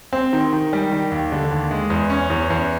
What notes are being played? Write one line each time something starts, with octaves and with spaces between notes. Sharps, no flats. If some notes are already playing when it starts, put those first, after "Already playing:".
C4
D#3
D#3
G3
D#3
D#2
D3
D#2
G#3
E2
C#4
E2
E2